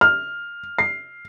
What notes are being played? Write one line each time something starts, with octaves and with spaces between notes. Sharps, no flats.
F6
C7